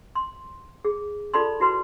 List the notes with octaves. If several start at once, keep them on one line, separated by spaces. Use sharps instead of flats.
C6
G#4
F4 A4 D5 A5 B5 C6
E4 F#4 B4 C6